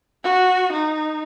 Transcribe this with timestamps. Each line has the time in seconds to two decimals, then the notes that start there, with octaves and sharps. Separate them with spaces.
0.24 F#4
0.73 D#4